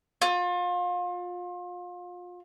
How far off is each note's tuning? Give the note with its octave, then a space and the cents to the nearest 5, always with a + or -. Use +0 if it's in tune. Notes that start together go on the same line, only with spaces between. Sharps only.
F4 +30